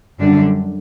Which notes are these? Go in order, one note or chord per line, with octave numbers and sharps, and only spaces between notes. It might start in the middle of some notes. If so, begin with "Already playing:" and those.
F#2 D3 G3 D4